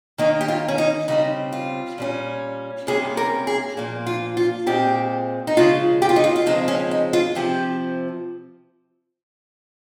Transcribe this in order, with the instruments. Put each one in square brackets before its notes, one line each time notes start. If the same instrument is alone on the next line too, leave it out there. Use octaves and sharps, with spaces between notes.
[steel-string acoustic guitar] D#3 A#3 C#4 D#4
G4
F4
C#4
D#4
C#3 G3 C4 D#4
F4
A#2 G3 C#4
C3 G3 A#3 C#4 G#4
A#4
G#4
A#2 F3 A#3
F4
F4
A#2 G#3 C4 G4
D#4
C#3 F3 G#3 F4
G4
F4
D#4
F4
F4
C#3 F3 G#3 C4 D#4
C#4
D#4
F4
C3 F3 C4 G4